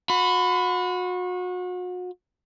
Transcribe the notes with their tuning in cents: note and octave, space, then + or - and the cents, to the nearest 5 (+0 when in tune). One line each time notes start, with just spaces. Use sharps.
F#4 -35 B5 +25